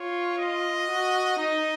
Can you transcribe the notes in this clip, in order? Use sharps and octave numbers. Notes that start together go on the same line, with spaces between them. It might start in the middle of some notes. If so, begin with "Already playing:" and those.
Already playing: F4 C#5
D#5
F#4
D#4 D#5